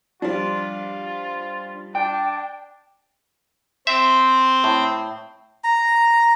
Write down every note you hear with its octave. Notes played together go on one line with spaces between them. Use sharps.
F3 G3 D4 F4
D4 G5
C4 C5 E5
A2
A#5